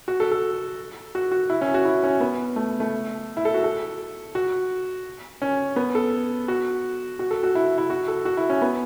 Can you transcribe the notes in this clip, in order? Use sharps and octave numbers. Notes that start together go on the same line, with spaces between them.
F#4
A4
A4
F#4
F#4
E4
C#4
F#4
E4
C#4
B3
A3
A3
E4
A4
F#4
A4
F#4
C#4
B3
A4
F#4
F#4
A4
F#4
E4
E4
F#4
A4
F#4
E4
C#4
B3